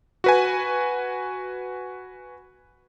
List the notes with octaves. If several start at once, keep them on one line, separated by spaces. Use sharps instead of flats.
F#4 B4 G#5